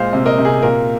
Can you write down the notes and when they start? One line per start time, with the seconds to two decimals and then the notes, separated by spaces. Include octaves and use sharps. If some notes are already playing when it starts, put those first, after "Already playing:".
Already playing: A#2 G#3 C5 F5
0.13 C3
0.26 A#4 D#5
0.39 C3
0.45 G#4
0.62 A#2 A#4